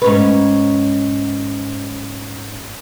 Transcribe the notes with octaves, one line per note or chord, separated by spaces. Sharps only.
G#2 C#4 B4